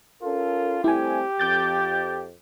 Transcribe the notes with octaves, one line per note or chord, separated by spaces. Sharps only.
C#4 F4 A4 A#4
G3 A3 C4 E4 G4 G#5
F2 D6 G6 A6